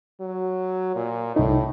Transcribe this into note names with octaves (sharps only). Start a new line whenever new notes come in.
F#3
A#2
C2 A2 D#4